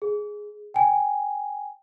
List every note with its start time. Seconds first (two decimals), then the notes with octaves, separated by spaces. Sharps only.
0.02 G#4
0.74 G5 G#5